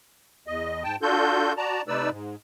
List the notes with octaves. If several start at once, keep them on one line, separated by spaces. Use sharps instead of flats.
E2 D#5
G#2 G5 A5
D4 F4 F#4 A4 G6
F#4 D5 A5 A#5
C3 A3 D#4 B4 D5 E6
G#2